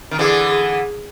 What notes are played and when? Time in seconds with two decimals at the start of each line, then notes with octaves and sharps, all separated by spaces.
0.11 D#3
0.18 D3 E3 G#4
0.47 G#4